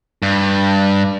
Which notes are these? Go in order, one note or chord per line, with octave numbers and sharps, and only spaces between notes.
G2